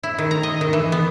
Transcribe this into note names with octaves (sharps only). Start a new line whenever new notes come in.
E4
D#3
A#5
D#5
D#3
E3
B3